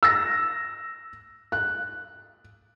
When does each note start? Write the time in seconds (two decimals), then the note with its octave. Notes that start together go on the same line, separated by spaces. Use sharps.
0.03 E6 A#6
1.52 F#6